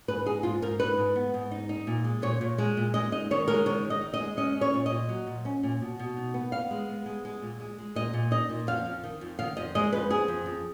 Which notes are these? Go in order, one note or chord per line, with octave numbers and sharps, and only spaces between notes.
G#2 B4
D#4 G#4
G#2 F4
G#2 A#4
D#4 B4
G#2
B3
G#2
D#4
D#4
A#2
G#3
A#2 C#5
A#2
G#3
A#2
G#3 D#5
D#4 D#5
D#3 C#5
G#3 A#4
D#3 C#5
D#3
D#5
D#4
D#5
G#3
C#4 D#5
C#4
C#5
A#2
A#2 D#5
F#3
A#2
C#4
A#2
B2
B2
D#4
B3
B3 F5
G#3
B3
G#3
G#3
A#2
G#3
G#3
A#2 D#5
A#2
D#4 D#5
A#2
F2 F5
F2
D#3
F2
D#3 F5
F2 D#5
G#3 D#5
F2 B4
F3 G#4
F2
F2